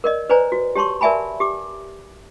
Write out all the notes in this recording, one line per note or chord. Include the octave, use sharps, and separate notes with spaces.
A#4 D5 D#5
B4 C5 D5 G#5 A#5
F#4
G4 C#5 A5 C6 C#6
A#4 D5 E5 G#5 A5 B5
G4 D6